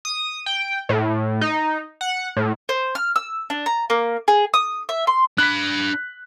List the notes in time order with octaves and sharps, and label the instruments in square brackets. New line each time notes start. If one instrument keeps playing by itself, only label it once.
[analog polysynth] D#6
G5
A2
D#4
F#5
A2
[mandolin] C5
F6
E6
D4
A#5
A#3
G#4
D#6
E5
C6
[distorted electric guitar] D4 B5 [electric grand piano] F#6 B6